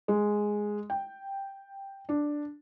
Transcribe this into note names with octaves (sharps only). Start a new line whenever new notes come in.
G#3
G5
D4